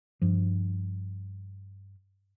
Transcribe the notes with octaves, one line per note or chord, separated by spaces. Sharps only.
G2 F3